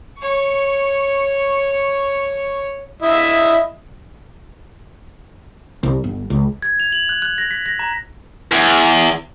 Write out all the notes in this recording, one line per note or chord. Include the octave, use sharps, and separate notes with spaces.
C#5 C#6
E4 D#5 E5
C2
G1
C#2
G#6
F7
F#7
F#6
F#6
A#6
B6
A#6
A#5
E2